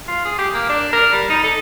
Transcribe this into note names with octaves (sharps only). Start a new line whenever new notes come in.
F4
G#4
G4
A#3
D4
A#4
G3
D#4
A4